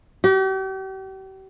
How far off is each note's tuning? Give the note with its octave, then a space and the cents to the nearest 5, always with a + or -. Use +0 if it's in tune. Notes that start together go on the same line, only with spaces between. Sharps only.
G4 -40